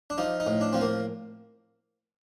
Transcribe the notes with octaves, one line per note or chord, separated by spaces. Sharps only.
D4
F3 D#4
D#4
A2
D4
F3 C4
A#3